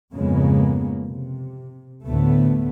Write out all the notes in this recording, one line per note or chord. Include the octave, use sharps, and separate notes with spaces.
F2 G#2 C#3 G#3 A#3 B3
C3
D2 A2 D3 A3 B3